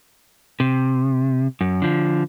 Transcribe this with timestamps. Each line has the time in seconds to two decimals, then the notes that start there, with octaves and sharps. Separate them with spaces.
0.60 C3
1.61 F#2
1.82 D3 F3